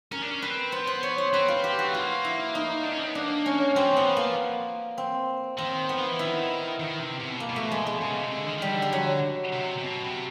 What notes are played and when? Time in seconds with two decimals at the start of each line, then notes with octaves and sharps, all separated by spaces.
0.12 C#4 A#4
0.22 D4
0.31 C#4
0.42 C4 B4
0.72 B3 C5
0.87 C5
1.03 C#5
1.18 C5
1.34 C4 B4
1.48 F4
1.64 G4
1.79 F#4
1.88 A3
1.94 A#3 F4
2.24 E4
2.55 D#4
2.83 D4
2.91 C#4
2.99 C4
3.07 B3
3.15 A#3 D4
3.46 C#4
3.76 F#3 C4
3.86 F3
3.94 E3 B3
4.03 F3
4.17 A#3
4.98 C4
5.58 D#3 C4
5.89 B3
5.98 F3
6.08 E3
6.19 D#3 E4
6.80 D#3
7.00 C3
7.20 C3
7.31 B2
7.40 A#3
7.49 B2
7.56 A3
7.72 G#3
7.87 G#3
8.01 C#3
8.17 C3
8.31 D3
8.46 D#3
8.58 D#3
8.62 D3 G3
8.82 G3
8.93 F#3
9.53 C3
9.78 C3
9.83 B2
10.04 C3